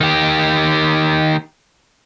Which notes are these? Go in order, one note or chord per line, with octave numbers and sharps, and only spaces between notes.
D#3 G4